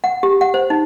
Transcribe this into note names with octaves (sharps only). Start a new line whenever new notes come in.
F#5
G4
F#5
C5
D#4